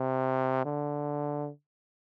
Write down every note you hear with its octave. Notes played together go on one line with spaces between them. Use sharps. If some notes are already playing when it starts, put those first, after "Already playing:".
Already playing: C3
D3